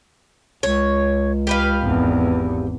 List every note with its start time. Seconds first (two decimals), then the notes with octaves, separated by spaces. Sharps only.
0.63 C#2 C#5
1.47 G4 B4 F5
1.82 G#1 E2